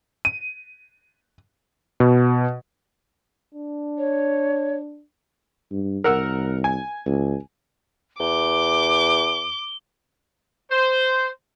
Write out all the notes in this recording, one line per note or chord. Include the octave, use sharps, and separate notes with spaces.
D#7
B2
D4
C#5
G2
C2 A#4 F#5 E6
G#5
C#2
E2 D6 G7
C5